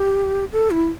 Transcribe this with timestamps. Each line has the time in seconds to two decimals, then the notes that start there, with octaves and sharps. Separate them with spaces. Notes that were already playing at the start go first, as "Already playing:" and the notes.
Already playing: G4
0.52 A4
0.71 E4